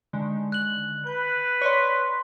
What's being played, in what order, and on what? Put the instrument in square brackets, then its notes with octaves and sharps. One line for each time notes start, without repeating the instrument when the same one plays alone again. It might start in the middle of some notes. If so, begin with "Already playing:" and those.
[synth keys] D3 D#3 G#3
[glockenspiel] F#6 F#7
[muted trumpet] B4 [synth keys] G6
[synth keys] C#5 D5 [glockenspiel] C6 C#6